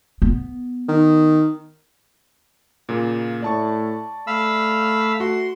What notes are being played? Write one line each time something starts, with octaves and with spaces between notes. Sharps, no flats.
B3
D#3
A#2 C#3 A#3
A2 D5 A5 C#6
A3 F5 B5 E6
F#4 C6